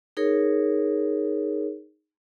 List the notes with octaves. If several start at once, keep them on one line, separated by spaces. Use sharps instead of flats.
D#4 G#4 A#4 C#5